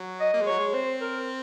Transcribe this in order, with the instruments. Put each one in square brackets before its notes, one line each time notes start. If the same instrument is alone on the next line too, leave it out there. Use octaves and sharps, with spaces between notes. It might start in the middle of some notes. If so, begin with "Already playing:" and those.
Already playing: [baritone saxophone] F#3
[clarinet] D#5
[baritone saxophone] A#3
G#3
[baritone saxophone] F#3 [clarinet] C#5
[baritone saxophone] G#3
[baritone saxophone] C4 [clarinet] C5
[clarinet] A#4